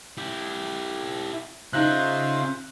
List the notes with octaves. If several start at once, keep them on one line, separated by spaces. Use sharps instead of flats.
E4 G4
C#3 D#4 F4 C5 E5 F#6